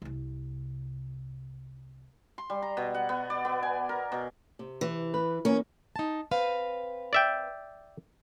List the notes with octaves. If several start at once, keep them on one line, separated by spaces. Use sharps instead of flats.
C2 C3
C6
G3
A#5
B2
F#5
B3
D5
B3
G#5
A#4
B2
C3
E3
B4
E2 A#3 C#4 A#4
D#4 A5
C4 B4 F5
D5 E5 G5